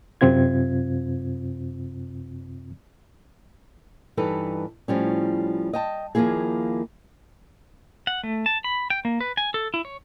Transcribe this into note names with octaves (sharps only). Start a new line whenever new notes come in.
F#2 C3 C4 F4 G#6
G2 E3 D#4 G4 A4 B4
A2 F3 G3 C#4
D#5 G5 A5
D#2 F3 A3 A#3 E4 G#4
F#5
A3
A5
B5
G5
A#3
B4
G#5
A4
E4
C#5